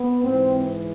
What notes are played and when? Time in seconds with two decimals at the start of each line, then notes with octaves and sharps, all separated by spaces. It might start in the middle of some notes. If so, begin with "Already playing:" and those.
Already playing: B3
0.23 G#2 E3 G#3 C4